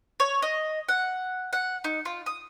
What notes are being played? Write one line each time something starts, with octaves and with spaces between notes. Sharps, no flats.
C#5
D#5
F#5
F#5
D#4
F4
D#6